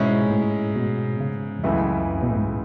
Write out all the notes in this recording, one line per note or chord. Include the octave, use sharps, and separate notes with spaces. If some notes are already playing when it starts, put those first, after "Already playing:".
Already playing: G#2 B2 G#3 C#4 E4
A2
B2
C#3
E2
C#2 F#2 C#3 E3 A3 E4
B2
A2
G#2